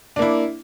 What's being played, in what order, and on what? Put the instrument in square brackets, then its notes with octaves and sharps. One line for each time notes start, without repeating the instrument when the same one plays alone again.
[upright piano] D4
A#3
E4